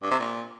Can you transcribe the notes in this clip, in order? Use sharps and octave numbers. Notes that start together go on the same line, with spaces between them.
G2
C3
A#2